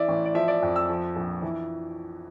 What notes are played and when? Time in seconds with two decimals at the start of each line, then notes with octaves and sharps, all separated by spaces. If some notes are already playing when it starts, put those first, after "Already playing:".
Already playing: E3 D5 E5
0.09 A1
0.25 D5
0.35 F3 E5
0.48 D5
0.63 F2
0.76 E6
0.89 F3
1.16 A#1
1.42 E3